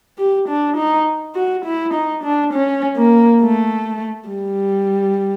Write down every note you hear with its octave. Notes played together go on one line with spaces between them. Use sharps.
G4
D4
D#4
F#4
E4
D#4
D4
C#4
A#3
A3
G3